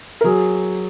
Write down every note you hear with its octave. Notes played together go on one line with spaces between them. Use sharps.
A#4
F#3 G#4